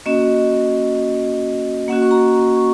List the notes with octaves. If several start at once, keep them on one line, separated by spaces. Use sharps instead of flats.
A#3 C#4 F#4 D#5
A#3 C#4 F#4 F#5
C#6
A#5
C#6